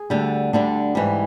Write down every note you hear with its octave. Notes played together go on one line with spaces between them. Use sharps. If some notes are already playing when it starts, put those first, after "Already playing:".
Already playing: G#4
D2 D3 G3
D2 D3 G3 D4
G#2 E3 G3